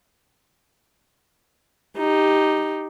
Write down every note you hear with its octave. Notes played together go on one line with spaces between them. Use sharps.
D#4 G4